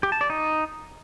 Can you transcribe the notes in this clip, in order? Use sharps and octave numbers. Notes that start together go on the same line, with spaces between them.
G4
A5
D5
D#4